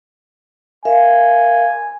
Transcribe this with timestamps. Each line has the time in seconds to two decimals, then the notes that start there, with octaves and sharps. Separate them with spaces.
0.85 A#4 E5 F5 G#5